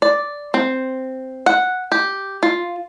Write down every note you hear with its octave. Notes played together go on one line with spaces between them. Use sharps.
D5
C4
F#5
G4
F4